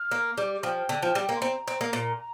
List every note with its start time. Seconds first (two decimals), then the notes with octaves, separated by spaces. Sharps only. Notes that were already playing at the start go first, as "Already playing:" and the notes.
Already playing: F6
0.11 A#3
0.38 G3 D6
0.63 F3 G5
0.89 D3
1.02 F3
1.15 G3
1.29 A#3
1.36 C6
1.41 C4 A#5
1.68 C4
1.81 A#3
1.93 A#2